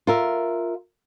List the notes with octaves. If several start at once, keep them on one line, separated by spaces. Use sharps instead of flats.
F4 A#4 E5